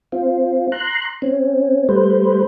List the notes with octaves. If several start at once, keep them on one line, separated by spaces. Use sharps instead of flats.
C4 F4
A#5 C6 F#6
C4 C#4
G3 A3 B4 C5